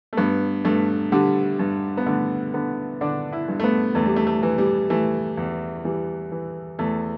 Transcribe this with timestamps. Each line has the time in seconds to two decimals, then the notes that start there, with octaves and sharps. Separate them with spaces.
0.13 A3
0.17 G2 B3
0.65 G2 A3
1.12 D3 G3
1.59 G2
1.97 B3
2.06 D3 A3
2.54 D3 B3
3.01 D3 D4
3.33 E4
3.48 G2
3.60 A3
3.64 B3
3.95 E2 A3
4.06 G3
4.16 A3
4.27 A3
4.43 E3
4.58 G3
4.90 E3 A3
5.38 E2
5.85 E3 G3
6.32 E3
6.79 E2 A3